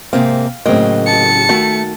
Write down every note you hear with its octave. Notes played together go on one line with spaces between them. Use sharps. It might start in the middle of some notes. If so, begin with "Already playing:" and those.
G#2 C3 A#3 C4 F5
A2 C#3 F#3 A#3 C4 D#5
A5 C#7
D#3 A3 F#4